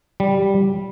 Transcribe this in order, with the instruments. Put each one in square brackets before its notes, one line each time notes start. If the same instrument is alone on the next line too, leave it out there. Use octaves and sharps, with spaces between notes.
[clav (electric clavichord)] G3